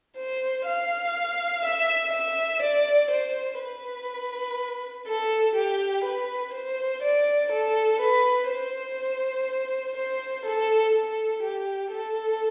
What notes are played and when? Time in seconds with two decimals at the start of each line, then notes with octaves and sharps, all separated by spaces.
0.17 C5
0.66 F5
1.64 E5
2.13 E5
2.62 D5
3.10 C5
3.59 B4
5.07 A4
5.55 G4
6.04 B4
6.53 C5
7.02 D5
7.51 A4
8.00 B4
8.49 C5
9.96 C5
10.45 A4
10.94 A4
11.43 G4
11.92 A4